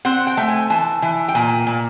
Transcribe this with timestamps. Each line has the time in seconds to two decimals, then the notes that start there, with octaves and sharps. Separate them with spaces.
0.05 C4 F#5
0.27 G5
0.37 A3
0.48 G#5
0.70 E3 A5
1.02 E3
1.28 G5
1.35 A#2 G#5
1.67 A#2